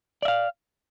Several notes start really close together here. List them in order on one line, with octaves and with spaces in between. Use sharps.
D5 E5 F5